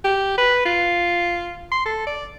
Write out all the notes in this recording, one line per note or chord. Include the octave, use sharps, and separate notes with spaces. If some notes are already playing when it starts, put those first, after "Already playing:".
G4
B4
F4
C6
A4
D5